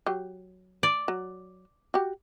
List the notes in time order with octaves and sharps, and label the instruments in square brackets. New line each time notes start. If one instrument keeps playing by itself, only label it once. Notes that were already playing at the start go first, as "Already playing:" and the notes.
[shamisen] F#3 G4
[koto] D5
[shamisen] F#3
F#4 G4